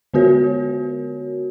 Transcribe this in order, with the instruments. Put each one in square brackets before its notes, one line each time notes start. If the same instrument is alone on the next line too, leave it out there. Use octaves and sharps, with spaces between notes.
[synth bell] D3 B3 F#4 A#4 C#5